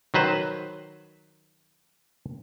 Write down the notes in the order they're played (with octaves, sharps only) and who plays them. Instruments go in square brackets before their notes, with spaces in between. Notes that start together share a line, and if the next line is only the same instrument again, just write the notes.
[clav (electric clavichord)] D#3 F#3 B4 C5